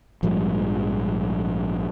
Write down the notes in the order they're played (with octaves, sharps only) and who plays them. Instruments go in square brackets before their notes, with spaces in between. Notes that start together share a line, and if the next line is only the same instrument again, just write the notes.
[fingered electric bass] A#1 G#2 F3 G3